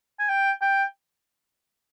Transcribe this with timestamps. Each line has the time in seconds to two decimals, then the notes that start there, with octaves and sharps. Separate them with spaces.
0.19 G#5
0.29 G5
0.61 G5